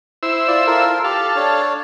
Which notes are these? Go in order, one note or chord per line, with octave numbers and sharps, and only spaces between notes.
E4 C5 E6
F4 D5
F4 A4 A#4
G4 A4 F5
D4 C#5